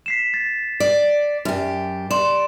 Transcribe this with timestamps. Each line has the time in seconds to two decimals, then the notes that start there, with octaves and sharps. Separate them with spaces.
0.06 B6 C7 E7
0.34 A6
0.80 D5
1.45 F#2 G4
2.11 D5 C6 E7